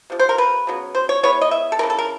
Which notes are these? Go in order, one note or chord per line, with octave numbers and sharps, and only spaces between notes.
C3 F3
C5
A#4
B4
C#3 F#3 B3
C5
C#5
E3 G#3 B3 C#5
D#5
E5
A4
C#3 E3 A3 A#4
A4
A#4